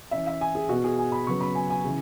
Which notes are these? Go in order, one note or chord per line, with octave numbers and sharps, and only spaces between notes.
E3 C#4 E5
E5
G#5
G#4
B2 B3 F#4
G#4
G#5
B5
C#3 F#3 B3 C#6
B5
G#5
G#5
C#3 E3